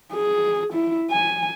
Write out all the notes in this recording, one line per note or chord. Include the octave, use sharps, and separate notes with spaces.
G#4
E4
G#5